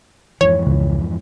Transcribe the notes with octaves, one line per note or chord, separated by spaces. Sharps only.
F2 G#2 E3 C#5
C#2